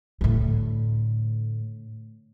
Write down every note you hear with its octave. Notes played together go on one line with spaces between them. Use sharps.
A2 D3